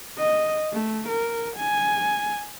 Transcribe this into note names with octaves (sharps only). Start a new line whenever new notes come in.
D#5
A3
A#4
G#5